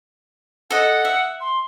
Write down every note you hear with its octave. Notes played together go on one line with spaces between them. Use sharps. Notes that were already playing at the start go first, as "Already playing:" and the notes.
A4 D#5 F#5
E5
C6